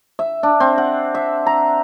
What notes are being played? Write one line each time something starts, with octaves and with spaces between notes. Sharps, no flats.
E5
D4
C4
F#5
E5
A#5